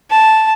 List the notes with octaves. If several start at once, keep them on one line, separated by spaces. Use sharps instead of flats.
A5